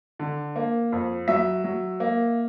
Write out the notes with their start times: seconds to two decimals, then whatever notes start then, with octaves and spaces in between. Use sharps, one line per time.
0.19 D3
0.56 A#3
0.92 F2
1.28 F#3 E5
1.64 F#3
2.00 A#3